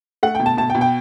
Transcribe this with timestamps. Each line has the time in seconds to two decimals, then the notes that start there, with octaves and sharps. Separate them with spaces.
0.23 A3 F#5
0.35 B2 G5
0.46 A5
0.57 B2 A5
0.70 G5
0.75 B2
0.81 G5